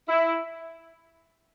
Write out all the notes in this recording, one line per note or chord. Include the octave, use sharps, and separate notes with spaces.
E4